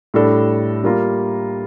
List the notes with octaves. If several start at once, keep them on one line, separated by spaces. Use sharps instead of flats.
A2 G3 D4 A4
G3 A#3 F4 A#4